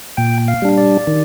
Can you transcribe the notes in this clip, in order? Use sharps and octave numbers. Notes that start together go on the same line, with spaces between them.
A#2 G5
F5
G3 D4
D5
D#3